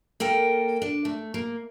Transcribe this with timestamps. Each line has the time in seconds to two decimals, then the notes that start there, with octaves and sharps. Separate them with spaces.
0.20 A#3 A4 A#4 G5
0.82 D4
1.05 A3
1.34 A#3